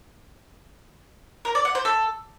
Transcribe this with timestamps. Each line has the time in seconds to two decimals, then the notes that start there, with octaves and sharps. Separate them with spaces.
1.45 A#4
1.55 D5
1.65 F#5
1.75 C5
1.85 A4